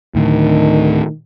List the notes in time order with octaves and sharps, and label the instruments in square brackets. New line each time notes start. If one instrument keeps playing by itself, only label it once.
[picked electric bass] D2 A2 D3 [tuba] D#3